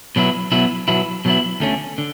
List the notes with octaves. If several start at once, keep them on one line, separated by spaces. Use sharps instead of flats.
B2 F#3 B3 E4
B2 F#3 B3 E4
B2 F#3 B3 E4
B2 F#3 B3 E4
D2 D3 A3 C#4
D3